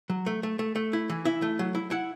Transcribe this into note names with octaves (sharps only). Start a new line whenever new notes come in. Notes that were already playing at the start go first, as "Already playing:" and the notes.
F#3
A3
A3
A3
A3
E4
E3
E4 E5
A3
F#3
E4
E4 F#5